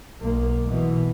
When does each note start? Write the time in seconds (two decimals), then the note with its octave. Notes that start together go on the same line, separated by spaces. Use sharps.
0.21 B1 A#3
0.69 B2 E3